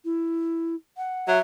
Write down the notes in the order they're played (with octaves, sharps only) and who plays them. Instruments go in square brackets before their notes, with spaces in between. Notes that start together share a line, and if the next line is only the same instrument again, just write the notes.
[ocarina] E4
F#5
[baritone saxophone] F#3 [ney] E5